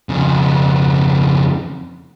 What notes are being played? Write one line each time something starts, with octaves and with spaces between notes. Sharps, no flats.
F2 C#3